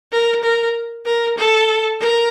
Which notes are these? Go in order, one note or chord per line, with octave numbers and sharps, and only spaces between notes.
A#4
A#4
A#4
A4
A#4